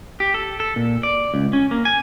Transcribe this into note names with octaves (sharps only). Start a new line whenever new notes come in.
G4
A4
A4
A#2
D5
C#2
C#4
A#3
G#5